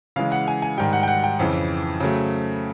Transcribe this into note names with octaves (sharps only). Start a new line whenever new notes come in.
C#3 E3 G#3 F5
F#5
G#5
G#5
G#2 D#3 G3 G5
F#5
G5
F#5
G5
F2 C#3 E3
C#3 F#3 A3